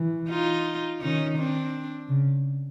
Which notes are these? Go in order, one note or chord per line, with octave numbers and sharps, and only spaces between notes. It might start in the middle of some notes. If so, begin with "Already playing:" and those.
Already playing: E3
D#4 F4
D#3 C#4 D#4
C4 D4
C#3